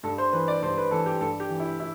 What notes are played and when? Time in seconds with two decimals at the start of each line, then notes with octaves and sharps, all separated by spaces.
0.03 G2 A4
0.18 C5
0.33 E3 B4
0.48 D5
0.62 G2 C5
0.78 B4
0.91 E3 A4
1.06 G4
1.21 G2 A4
1.40 G4
1.50 E3
1.60 E4
1.80 E4